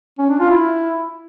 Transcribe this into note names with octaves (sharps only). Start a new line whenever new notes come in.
C#4
D4
F4
E4